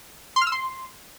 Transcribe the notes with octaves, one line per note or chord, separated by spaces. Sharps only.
C6
F6
E6
C6